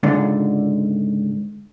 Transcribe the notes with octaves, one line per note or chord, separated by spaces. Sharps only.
C#2 G#2 D3